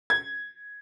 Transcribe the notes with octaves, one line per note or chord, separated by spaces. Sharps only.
G#6